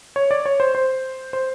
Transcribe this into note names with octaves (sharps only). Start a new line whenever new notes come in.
C#5
D5
C#5
C5
C5
C5